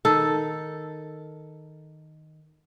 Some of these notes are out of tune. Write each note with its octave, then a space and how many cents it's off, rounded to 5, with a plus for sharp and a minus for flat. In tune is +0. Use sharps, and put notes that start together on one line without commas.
D#3 +0 A4 +0